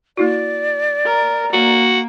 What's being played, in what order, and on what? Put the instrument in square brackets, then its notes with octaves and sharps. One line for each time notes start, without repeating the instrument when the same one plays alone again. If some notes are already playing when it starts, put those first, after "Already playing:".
[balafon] A#3 E4 F#4 [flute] D5
[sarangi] A#4
[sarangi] A#3 [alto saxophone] F#4